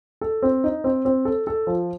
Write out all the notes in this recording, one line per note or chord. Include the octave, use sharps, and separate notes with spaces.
A4
C4
D#4
C4
C4
A4
A4
F3